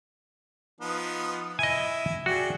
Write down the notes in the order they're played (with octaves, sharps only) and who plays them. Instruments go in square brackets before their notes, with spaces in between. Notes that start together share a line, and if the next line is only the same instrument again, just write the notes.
[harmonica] F3 B3 D#4
[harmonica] E4 [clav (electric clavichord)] D#5 G#5
[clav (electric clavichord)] F#4 [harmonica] G#4 D5 G5